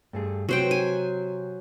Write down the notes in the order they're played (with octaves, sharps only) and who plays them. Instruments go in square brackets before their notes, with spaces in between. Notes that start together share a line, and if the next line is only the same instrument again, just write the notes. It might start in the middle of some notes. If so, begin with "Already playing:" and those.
[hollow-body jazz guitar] G2 A3 G#4
[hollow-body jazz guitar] C3 [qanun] F#3 C5 G5
[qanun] G#5